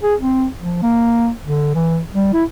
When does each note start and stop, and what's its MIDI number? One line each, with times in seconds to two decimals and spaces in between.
0.03 0.15 68
0.20 0.46 60
0.60 0.82 53
0.83 1.30 58
1.46 1.75 50
1.75 1.99 52
2.15 2.32 55
2.33 2.44 64